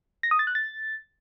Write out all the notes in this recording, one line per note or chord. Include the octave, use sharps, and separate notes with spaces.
A#6
D#6
A6
F#6
A6